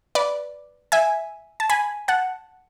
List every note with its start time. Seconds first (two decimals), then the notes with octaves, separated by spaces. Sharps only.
0.15 B4 D5
0.92 E5 G#5
1.60 A5
1.70 G#5 B5
2.08 F#5 A5